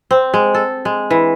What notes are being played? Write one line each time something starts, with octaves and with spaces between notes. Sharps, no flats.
C4
G#3
A4
G#3
E3